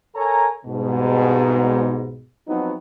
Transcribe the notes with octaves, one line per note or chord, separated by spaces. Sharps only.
A4 A#4 C#5 G#5 A#5
C2 G#2 B2
F3 F#3 B3 C4 D#4